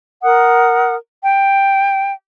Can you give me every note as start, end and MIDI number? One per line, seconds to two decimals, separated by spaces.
0.22 0.95 70
0.22 0.95 78
0.22 0.95 87
1.22 2.11 79